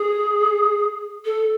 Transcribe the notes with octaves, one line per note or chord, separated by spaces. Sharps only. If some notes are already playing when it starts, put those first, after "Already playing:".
Already playing: G#4
A4